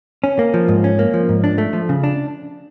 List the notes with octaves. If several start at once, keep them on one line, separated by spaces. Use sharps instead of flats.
C#4
A#3
F3
G#2
C#4
A#3
F3
G#2
D4
A3
F3
C#3
D4